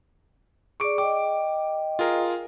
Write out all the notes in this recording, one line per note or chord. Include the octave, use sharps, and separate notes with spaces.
G#4 D5 C#6 D6 D7
D#5 G5 D6
F4 G#4 A#4